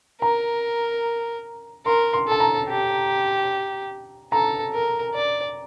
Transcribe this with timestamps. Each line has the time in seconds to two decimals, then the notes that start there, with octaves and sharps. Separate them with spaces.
0.21 A#4 A#5
1.86 A#4 C6
2.13 C6
2.27 A4 A5
2.40 A#5
2.69 G4
4.32 A4 A#5
4.73 A#4
5.14 D5